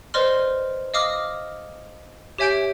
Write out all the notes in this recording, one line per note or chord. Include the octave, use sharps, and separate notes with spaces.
B4 C5 D5 D#5 C6 F6
D#5 F5 D6 D#6 F6 A#6
G4 C#5 E5 G#5 G6 D7